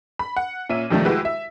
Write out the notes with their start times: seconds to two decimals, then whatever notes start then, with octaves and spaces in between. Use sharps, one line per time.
0.19 B5
0.36 F#5
0.69 A#2 C#4 E5 D#7
0.90 F2 C3 D#3 F3 G3 A3
1.05 G#3 E4 F#4 G4 B4
1.25 E5